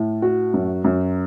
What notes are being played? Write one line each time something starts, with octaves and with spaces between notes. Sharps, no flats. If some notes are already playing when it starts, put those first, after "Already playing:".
Already playing: A2
F#4
F#2
F#2